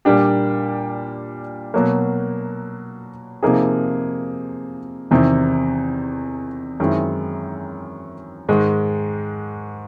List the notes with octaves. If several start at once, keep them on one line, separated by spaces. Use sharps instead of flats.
A#2 G3 A#3 D4 G4
B2 F#3 A#3
C3 F3 A#3 D#4 G#4
E2 C3 D#3
F#2 D#3 G#3 C4 E4
G#2 D#3 G#3